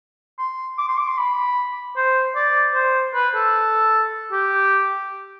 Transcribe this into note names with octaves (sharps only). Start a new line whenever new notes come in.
C6
D6
C6
D6
C6
B5
C5
D5
C5
B4
A4
G4